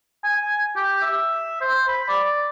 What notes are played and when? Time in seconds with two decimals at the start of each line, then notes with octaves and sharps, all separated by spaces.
0.24 G#5
0.76 G4
1.02 E5
1.61 C5
1.88 B5
2.08 D5